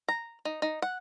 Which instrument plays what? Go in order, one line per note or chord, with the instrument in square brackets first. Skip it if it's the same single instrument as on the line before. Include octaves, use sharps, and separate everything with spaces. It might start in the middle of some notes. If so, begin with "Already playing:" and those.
[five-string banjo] A#5
D#4
D#4
F#5